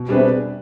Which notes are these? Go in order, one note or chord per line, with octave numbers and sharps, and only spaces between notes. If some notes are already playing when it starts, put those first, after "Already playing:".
Already playing: B2
C3 G3 D4 G#4 B4